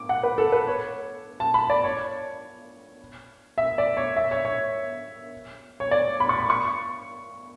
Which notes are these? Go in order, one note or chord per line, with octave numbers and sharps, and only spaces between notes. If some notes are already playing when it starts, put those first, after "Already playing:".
Already playing: D6
F#5
B4
A4
B4
C#5
A5
B5
D5
C#5
E5
D5
C#5
E5
C#5
C#5
C#5
D5
B5
C#6
B5
C#6